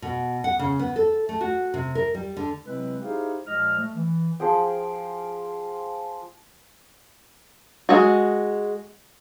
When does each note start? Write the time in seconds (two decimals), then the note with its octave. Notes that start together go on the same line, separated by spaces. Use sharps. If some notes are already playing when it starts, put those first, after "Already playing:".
0.02 B2
0.44 F#5
0.59 C#3
0.79 B3
0.96 A4
1.29 A3
1.41 F#4
1.74 C3
1.95 A#4
2.15 G3
2.37 D3
2.66 C3 F#3 G#3 C4 E4 B4
3.02 D#4 E4 G4 G#4 C5 F5
3.47 A#2 F3 G#3 D#5 F6
3.79 A3
3.95 E3
4.40 F3 G#4 G5
7.89 G#3 F#4